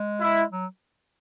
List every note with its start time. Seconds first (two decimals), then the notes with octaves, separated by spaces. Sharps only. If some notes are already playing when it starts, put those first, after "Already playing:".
Already playing: G#3
0.20 E4
0.52 F#3